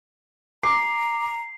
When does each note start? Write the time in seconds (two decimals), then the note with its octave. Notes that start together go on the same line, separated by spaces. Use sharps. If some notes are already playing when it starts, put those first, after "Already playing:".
0.63 A#5 D6 C7